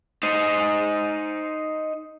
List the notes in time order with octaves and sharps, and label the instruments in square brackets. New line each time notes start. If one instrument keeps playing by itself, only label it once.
[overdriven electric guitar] D#4 C5